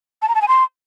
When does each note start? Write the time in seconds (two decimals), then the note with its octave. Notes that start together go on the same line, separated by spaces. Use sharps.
0.22 A5
0.29 A#5
0.35 A5
0.42 G#5
0.48 C6